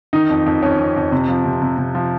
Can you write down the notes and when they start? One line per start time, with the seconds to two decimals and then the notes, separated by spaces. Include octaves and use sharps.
0.13 D#3 D#4
0.30 F2
0.46 F2
0.62 F2 C#4
0.79 F2
0.96 F2
1.12 C3
1.28 F3
1.45 C3
1.62 C3
1.78 C3
1.95 F3